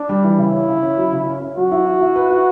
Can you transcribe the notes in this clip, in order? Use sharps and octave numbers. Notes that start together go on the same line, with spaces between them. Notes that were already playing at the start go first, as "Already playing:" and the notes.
Already playing: D4
G3
E3
C#3 E4
C#4
C#3
C#4
F#3
C#3
C#4
C#4
F#3 F#4
E4
E4
E4
B4
E4